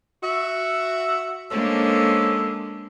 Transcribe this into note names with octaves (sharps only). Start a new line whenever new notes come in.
F#4 E5
D3 G#3 A#3 C#4 D4 A4 C5